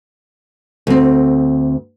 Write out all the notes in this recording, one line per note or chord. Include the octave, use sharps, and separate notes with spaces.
D2 C4